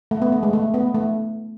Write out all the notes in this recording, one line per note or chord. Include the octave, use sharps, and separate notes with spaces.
A3
B3
A3
G#3
A3
B3
A3